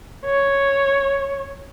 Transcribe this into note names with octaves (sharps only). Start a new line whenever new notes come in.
C#5